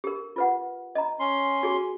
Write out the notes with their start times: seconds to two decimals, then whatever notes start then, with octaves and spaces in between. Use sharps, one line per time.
0.04 G4 A#4
0.36 F4 B4 F#5
0.95 D#5 A#5
1.20 C#4 C6
1.63 F#4 G#4